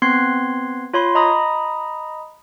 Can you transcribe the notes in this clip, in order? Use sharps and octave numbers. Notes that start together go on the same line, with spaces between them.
B3 C4 C6 F#6 G#6 C7
F4 C#5 B5 C6
D#5 A#5 B5 D#6